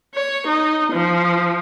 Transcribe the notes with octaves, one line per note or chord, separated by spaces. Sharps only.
C#5
D#4
F3